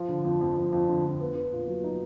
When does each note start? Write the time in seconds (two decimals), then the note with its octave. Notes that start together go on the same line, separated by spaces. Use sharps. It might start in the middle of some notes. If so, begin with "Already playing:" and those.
Already playing: F3
0.09 D3
0.25 F2
0.41 F2
0.56 F2
0.73 F2
0.88 D3
1.05 F2
1.20 B3
1.35 B3
1.52 A#2
1.68 F#3
1.84 D#4